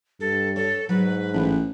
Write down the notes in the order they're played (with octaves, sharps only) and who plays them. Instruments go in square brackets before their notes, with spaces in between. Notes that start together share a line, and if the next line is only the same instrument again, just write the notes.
[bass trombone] G2 [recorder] A4
[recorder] A4 [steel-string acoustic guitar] C#5
[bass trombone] G#2 [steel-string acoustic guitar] F#3 [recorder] B4
[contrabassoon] A1